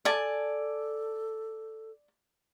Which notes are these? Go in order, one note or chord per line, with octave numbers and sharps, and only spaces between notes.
A4 D5 G#5 A5